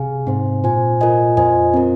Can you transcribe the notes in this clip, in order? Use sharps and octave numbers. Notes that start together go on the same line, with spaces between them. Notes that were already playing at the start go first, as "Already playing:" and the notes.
Already playing: C3 G#4 F5 G#5
G#2 C4 D#4 C5 G#5
A#2 F4 C5 G#5
F4 A#4 D#5 G#5
F2 F4 C5 D#5 G#5
C4 F4 A#4